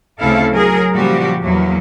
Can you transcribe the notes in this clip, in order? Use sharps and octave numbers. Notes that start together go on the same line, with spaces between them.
D2 C#3 C4 E4 A4 F5
F#3 G#4 A#4
A#2 C#3 F3 G3 F#4 G4
E2 F#3 A#3